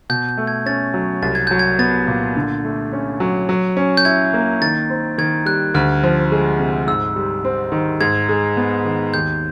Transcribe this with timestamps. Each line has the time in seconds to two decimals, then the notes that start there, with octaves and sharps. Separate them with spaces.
0.10 B2 G6
0.29 G6
0.37 A3
0.47 G#6
0.66 C#4 A6
0.94 F#3
1.22 C2 A6
1.35 G#6
1.47 F#3 G6
1.59 G#6
1.79 B3 A6
2.07 A#2
2.36 D3
2.64 A3
2.93 C#4
3.20 F#3
3.49 F#3
3.77 C#4
3.97 G6
4.05 E4 G#6
4.34 A#3
4.62 D#3 A6
4.90 C4
5.18 D#3 G#6
5.46 G3 F#6
5.74 D2 F6
6.03 F3
6.32 G#3
6.59 C3
6.87 G#2 E6
7.16 G3
7.45 C4
7.72 D#3
8.01 G#2 G#6
8.29 G#3
8.57 B3
8.85 D#3
9.14 D#2 G6